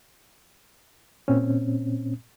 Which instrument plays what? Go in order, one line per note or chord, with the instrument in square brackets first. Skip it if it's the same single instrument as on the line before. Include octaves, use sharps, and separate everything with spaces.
[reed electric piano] A#2 C4 C#4